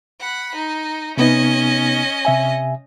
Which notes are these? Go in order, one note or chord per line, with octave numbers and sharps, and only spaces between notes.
F#5 B5
D#4
C3 B3 C#4 D#4 D#5
C3 E5 G#5